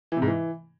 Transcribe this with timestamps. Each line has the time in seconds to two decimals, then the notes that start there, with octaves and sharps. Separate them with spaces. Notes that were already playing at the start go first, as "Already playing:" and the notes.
0.12 E3
0.17 C3
0.22 G#2
0.27 E3